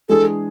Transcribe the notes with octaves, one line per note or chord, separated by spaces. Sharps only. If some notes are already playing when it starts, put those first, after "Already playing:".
E3 G#3 D4 G#4 A4